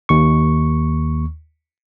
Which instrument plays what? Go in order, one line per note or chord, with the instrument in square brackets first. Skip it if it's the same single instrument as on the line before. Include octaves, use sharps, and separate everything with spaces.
[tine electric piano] D#2 C#6